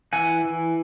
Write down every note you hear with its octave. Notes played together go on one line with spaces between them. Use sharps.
E3 F#5 G#5
E3